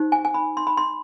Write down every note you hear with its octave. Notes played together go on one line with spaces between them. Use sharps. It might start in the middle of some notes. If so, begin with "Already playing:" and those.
Already playing: D#4 G4 C5
G#5
G#5
B5
C6
B5
C6